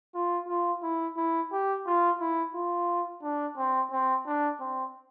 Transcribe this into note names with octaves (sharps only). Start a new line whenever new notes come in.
F4
F4
E4
E4
G4
F4
E4
F4
D4
C4
C4
D4
C4